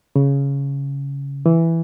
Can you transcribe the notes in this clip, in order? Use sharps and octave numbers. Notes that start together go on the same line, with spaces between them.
C#3
E3